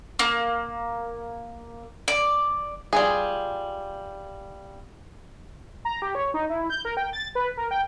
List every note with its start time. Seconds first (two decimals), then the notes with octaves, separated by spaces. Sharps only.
0.19 A#3
2.08 D5
2.93 G3 F4 G#4
5.85 A#5
6.02 G4
6.15 C#5
6.34 D#4
6.50 E4
6.70 G6
6.85 A#4
6.97 G5
7.13 A6
7.35 B4
7.57 A#4
7.71 G5